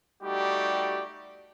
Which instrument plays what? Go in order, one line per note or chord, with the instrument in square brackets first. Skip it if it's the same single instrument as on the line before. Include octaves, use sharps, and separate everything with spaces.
[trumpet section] G3 A3 D#4 F#4 G4 D5